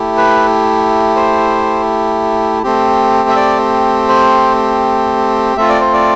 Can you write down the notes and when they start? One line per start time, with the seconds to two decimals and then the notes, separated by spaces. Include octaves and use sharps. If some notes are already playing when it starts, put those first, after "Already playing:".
Already playing: A3 E4 G4
0.17 B4
1.16 C5
2.63 A3 C4 G4
3.29 E5
3.36 D5
4.09 C5
5.57 A3 C4 F4 E5
5.69 D5
5.81 C5
5.93 D5